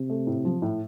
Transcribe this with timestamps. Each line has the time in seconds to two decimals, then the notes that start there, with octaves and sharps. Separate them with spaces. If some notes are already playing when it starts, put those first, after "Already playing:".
Already playing: C3
0.10 A3
0.27 A2
0.45 F3
0.62 A2